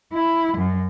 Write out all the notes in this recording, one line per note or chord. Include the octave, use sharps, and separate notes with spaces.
E4
F#2